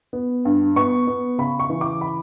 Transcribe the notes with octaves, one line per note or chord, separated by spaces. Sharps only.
B3
G2
B3 C#6
B3
C#3 B5
C#6
E3
D6
B5